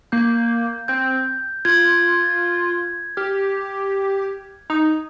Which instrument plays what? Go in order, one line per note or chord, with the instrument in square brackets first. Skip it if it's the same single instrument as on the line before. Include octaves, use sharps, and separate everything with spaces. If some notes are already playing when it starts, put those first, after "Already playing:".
[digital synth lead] A#3 [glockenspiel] G6
[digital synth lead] C4 [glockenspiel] G6
[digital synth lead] F4 [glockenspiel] G#6
[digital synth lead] G4 [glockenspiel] F6
[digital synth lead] D#4 [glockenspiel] D#6